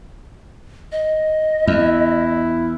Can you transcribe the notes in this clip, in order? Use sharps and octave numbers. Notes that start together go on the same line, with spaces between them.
D#5
E2 E4